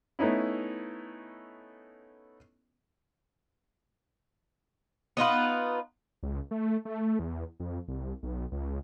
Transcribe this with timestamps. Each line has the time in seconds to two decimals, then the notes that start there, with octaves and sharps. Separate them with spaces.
0.19 A3 B3 C#4 D#4 E4
5.17 B3 D#4 F4 B4
6.23 C#2
6.51 A3
6.85 A3
7.19 E2
7.60 F2
7.88 C2
8.23 B1
8.52 C#2